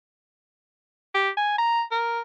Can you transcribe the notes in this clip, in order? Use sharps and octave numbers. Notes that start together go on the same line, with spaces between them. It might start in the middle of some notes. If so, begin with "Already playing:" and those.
G4
G#5
A#5
A#4